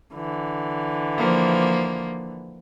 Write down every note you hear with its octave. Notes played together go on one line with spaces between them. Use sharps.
D3 E3
F3 A#3